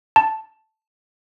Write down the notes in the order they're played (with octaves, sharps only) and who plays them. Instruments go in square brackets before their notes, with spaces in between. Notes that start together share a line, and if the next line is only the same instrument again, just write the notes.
[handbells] A5